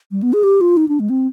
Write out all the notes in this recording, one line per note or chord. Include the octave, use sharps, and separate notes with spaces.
G3
B3
G#4
G4
F4
D#4
D4
G#3
C4